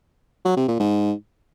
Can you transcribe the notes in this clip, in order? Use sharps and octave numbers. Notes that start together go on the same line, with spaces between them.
F#3
C3
A#2
G#2